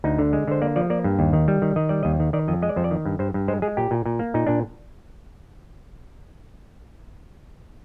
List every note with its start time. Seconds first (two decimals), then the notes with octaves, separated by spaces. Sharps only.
0.04 D2 D#4
0.19 D3
0.33 G#3
0.48 D3 C5
0.62 A#3 D5
0.76 F3 D5
0.90 A#3 D5
1.04 G2
1.19 D#2
1.33 D#3
1.48 G3
1.62 D#3
1.76 D#3 D#5
1.89 G3 D5
2.03 D#2 D#5
2.20 D#3
2.33 D#3 D5
2.48 F2 D#5
2.62 G#3 D#5
2.69 D5
2.76 F2 C5
2.84 D5
2.91 D#3
3.05 G2
3.19 G2 C5
3.34 G2
3.48 G#3 C5
3.62 G#3 G#4
3.77 A#2 G4
3.91 A#2
4.06 A#2
4.19 A#3
4.34 A#2 D#4
4.47 A#2 D4